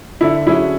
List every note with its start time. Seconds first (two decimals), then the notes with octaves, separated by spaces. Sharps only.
0.21 D3 E4
0.47 F#3 C#4 E4 G#4